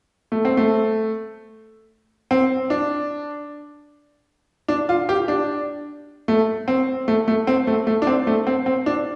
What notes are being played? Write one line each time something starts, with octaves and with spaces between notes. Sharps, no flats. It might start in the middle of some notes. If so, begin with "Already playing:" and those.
A3
C4
A3
C4
D4
D4
F4
G4
D4
A3
C4
A3
A3
C4
A3
A3
D4
C4
A3
C4
C4
D4